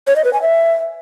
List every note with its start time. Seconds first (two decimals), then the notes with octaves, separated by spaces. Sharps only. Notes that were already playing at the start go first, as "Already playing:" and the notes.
0.07 C#5
0.16 D#5
0.25 B4
0.33 G#5
0.42 E5